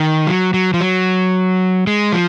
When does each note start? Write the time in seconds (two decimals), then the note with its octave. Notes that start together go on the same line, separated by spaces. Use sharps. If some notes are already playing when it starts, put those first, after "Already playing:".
Already playing: D#3
0.27 F#3
0.54 F#3
0.74 F3
0.81 F#3
1.87 G#3
2.12 F3